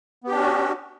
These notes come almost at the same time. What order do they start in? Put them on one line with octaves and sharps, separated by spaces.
B3 G4 D4 C#4 F#4